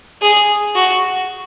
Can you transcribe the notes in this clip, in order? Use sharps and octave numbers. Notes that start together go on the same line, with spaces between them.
G#4
F#4